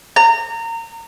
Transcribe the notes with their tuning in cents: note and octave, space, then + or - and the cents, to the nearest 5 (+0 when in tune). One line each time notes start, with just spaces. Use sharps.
A#5 -25